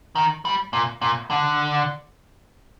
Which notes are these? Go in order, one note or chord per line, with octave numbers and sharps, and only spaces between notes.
D#3
G3
A#2
A#2
D3